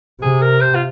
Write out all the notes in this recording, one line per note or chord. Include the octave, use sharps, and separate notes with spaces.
C3 G#4
A#4
C5
F4